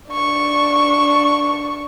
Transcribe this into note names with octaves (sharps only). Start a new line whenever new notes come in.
D4 C#6